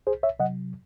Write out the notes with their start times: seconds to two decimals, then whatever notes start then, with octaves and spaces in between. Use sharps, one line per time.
0.07 C2 G#4 C5
0.23 C#5 E5
0.39 C3 F#3 D#5 F#5